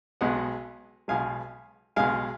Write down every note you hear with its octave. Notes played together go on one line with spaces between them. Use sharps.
B1 B2 G#3 D#5 F#5
B1 B2 G#3 F5 G#5
B1 B2 G#3 F5 G#5